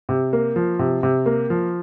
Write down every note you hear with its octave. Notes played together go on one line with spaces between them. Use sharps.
C3
A#3
F3
C3
C3
A#3
F3